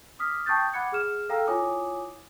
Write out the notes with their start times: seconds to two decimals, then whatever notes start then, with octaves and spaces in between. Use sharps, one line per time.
0.19 D6 D#6 F6 B6
0.46 G5 A5 C#6 D#6 G6 A6
0.74 F#5 B5 D6 F#6 G#6 C#7
0.92 G#4 F6 E7
1.29 A4 F5 G5 A#5 E6 F6
1.47 E4 F4 C#5 G#5 D6 D#6